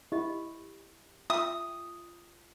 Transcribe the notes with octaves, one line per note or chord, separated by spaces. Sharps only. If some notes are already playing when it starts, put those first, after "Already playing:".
E4 G4 D#5
F4 E5 G5 D#6